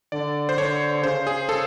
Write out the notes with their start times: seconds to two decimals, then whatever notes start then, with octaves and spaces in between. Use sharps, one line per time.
0.12 D3 D5
0.49 C5
0.58 D3 C#5
1.03 C#3 C5
1.27 G#4
1.49 A4